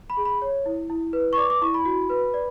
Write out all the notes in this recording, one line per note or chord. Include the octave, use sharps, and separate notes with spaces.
B5
G#4
B5
C#5
E4
E4
B4
C#6
D5 D6
D6
E4 C#6
B5
F#4
B4
D5